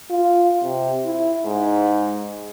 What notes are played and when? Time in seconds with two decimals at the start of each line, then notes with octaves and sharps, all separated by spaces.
0.10 F4
0.63 C3
1.06 E4
1.46 G#2